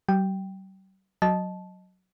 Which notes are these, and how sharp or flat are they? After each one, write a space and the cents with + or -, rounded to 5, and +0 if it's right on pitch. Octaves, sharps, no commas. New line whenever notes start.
G3 -45 G5 +0
F#3 +0 D#5 +0 A5 -15